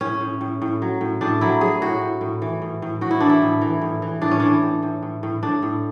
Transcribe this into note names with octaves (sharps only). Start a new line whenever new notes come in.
A2 C#4
A2
A2
A2
F#3
A2
A2 D4
F#3 E4
F#3 G#4
A2 F#4
A2
A2
E3
A2
A2
A2 F#4
E4
E3 D4
E4
A2
E3
A2
E3
A2 D4
C#4
E3 D4
A2
A2
A2
A2
A2 D4
A2